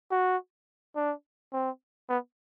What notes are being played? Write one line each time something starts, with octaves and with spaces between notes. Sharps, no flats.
F#4
D4
C4
B3